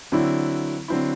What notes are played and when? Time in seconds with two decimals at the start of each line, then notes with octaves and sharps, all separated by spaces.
0.12 D3 F#3 C4 E4
0.88 D3 F#3 C4 E4